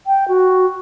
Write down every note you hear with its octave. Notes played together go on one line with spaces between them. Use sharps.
G5
F#4